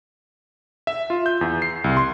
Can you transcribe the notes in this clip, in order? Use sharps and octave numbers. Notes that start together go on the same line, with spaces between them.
E5
F4
G6
E2
C7
C2
C6